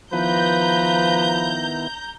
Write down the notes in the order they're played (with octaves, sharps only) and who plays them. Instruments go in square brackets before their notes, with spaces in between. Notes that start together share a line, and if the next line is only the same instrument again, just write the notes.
[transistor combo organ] D#3 B3 E4 [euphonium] F3 [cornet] B4 [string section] A#5 G6